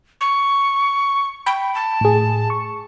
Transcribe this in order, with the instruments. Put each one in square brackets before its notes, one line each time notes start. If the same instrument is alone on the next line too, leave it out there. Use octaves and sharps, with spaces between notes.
[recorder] C#6
[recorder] G5 [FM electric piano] B5
[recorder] A5
[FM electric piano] A2 G#4
C#6